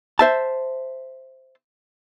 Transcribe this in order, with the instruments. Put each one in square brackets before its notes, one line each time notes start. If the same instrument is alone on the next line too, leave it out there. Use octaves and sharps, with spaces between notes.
[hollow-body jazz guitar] C5 E5 A5